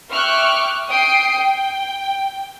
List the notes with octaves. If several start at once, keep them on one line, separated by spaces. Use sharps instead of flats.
E5 G5 C#6 D6 F6 F#6
G5 D#6 C7 D7
G5